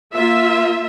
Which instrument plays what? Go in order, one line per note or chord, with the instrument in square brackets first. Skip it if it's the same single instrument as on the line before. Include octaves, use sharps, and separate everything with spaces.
[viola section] A#3 F4 E5